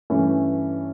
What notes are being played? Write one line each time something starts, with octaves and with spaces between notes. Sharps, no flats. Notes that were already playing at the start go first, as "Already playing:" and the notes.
G2 E3 A3 C#4